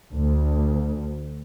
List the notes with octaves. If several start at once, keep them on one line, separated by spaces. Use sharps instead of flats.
D2